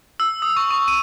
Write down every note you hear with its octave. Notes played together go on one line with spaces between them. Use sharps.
E6
D#6
C#6
C#6
D#7